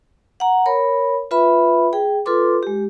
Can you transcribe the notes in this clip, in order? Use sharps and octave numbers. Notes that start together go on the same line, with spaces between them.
F#5 A#5
A#4 C#5 B5
F4 B4 E5 B5
G#4 G5
F4 A4 B4 C6 D6
G#3 G4